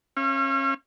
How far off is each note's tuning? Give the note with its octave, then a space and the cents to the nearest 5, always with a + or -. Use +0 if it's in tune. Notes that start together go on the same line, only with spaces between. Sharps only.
C#4 -35 F5 -40